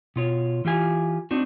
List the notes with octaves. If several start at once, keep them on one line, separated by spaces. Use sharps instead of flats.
B2 F4 C#5
E3 F4 G4 G#5
C4 D4 D#4 F#4